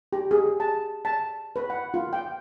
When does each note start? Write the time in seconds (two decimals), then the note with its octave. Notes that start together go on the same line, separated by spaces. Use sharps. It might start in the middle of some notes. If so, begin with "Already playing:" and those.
0.13 G4
0.31 G#4
0.60 A5
1.05 A5
1.56 B4
1.70 F#5
1.94 F4
2.13 G5